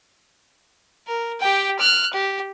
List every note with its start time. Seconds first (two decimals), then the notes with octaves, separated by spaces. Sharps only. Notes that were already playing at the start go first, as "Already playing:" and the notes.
1.07 A#4
1.40 G4 G5
1.79 F6 F#6
2.13 G4